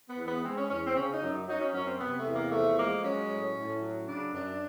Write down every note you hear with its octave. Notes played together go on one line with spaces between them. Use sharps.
B3
E2
B3
G#3 C4
C#4
E2 C#4
C4
C#3 C#4
D#4
F#2
F#3 D#4
C#4
F#2 C#4
C4
C3 B3
A3
E2
A#3
F3 A3
G#3 A#3
F#3 C#4
A2
A2
F#3
C#3 D4
F#2 D4